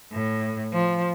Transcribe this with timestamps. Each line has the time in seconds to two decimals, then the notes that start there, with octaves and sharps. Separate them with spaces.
0.12 A2
0.73 F3